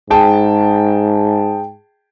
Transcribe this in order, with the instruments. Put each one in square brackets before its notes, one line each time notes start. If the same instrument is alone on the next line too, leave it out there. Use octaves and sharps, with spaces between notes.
[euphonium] G#2 [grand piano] G#4 G5 A5